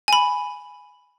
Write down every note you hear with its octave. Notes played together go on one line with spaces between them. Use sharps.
G#5 B5